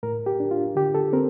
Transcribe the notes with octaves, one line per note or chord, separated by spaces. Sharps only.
A2 A#4
G4
D4
F4
D3 G4
A4
C4 A#4